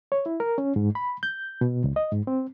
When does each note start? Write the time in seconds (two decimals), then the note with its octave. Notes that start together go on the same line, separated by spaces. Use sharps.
0.12 C#5
0.26 E4
0.40 A#4
0.58 C#4
0.76 G#2
0.95 B5
1.23 G6
1.61 B2
1.84 C#2
1.96 D#5
2.12 G#2
2.27 C4